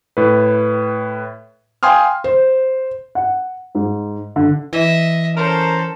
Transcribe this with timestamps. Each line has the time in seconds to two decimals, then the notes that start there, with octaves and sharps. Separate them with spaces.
0.17 A2 B4
1.83 F5 G5 G#5 C6 D#6 F6
2.24 C5
3.15 F#5
3.75 G#2
4.36 D3
4.73 E3 D#5 E5
5.37 C#4 A4 A#4 C5